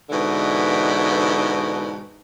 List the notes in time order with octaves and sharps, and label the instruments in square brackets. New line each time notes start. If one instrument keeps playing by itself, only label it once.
[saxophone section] G#2 B2 D3 E3